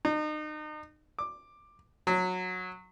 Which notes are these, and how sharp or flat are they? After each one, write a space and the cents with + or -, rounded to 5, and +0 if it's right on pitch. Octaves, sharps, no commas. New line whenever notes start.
D#4 -35
D6 +10
F#3 -15